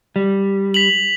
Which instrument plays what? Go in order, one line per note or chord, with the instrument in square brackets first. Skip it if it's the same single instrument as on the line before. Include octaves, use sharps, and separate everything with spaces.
[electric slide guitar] G3
[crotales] B6 F7 F#7